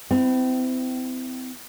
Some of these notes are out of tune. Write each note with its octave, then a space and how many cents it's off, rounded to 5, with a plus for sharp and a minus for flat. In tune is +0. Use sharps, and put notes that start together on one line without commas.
C4 -35 E4 +0